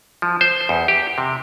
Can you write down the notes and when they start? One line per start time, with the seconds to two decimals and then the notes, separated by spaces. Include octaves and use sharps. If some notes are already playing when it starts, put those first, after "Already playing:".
0.22 F3
0.41 C5
0.69 E2
0.88 G4
1.18 C3